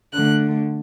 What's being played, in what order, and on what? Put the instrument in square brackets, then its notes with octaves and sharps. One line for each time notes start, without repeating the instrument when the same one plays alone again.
[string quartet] D3 A3 F#6